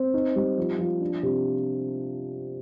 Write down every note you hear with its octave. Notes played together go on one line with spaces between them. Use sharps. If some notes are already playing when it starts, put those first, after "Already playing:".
Already playing: C4
D#4
G3
F3
F3
D4
C3